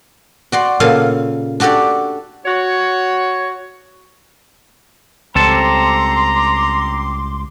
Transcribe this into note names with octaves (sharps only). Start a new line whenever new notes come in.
F#4 D5 C6
A#2 C#3 A4 F5
D4 F#4 G4 A4 D5
F#4 C#5
C#2 G3 C4 A4 A5 A#5 C6 D6